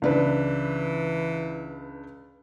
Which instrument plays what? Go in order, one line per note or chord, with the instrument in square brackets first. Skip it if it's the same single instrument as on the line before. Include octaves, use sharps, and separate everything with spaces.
[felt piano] C#2 D4 B4 [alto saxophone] E3